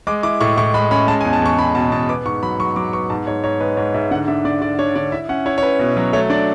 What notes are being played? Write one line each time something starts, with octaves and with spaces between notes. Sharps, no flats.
G#3 D6
E4 D6
A2 C#6
A2 C#6
G#3 B5
C#4 B5
G#3 A5
G#5
E2
A5
E2 C#6
E2 B5
B2 A5
E2 A5
B3 D6
G#2 C#6
F#3 B5
F#3 C#6
F#3 D6
B3 C#6
G#2 A5
G#2 C#5
G#2 C#5
G#3 B4
G#2 C#5
G#2 E5
D3 F#5
D4 E5
D3 D5
D3 D5
D4 C#5
D3 D5
E4 E5
C#4 F#5
E4 C#5
C#5
C#4 B4
B2
F#3
A3 C#5
D4 D5